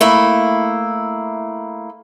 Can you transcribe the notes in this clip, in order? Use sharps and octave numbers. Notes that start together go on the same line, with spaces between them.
A3 A#3 E4